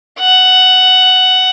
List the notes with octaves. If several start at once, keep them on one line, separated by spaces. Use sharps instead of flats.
F#5